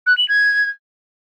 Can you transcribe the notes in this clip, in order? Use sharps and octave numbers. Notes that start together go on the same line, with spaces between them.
F#6
F#7
G#6